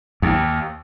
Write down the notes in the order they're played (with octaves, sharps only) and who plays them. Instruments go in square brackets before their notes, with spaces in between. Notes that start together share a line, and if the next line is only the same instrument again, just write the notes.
[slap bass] D#2